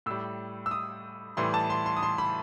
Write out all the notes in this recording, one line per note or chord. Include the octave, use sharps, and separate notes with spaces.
A2 G3 E6
E6
D#6
A2 E3 G3 C6
A5
C6
C6
D#6
C6
B5